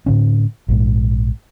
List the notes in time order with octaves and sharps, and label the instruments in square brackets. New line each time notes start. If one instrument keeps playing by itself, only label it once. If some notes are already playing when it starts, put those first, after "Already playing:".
[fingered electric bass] A2 D3 C#4
A#1 G#2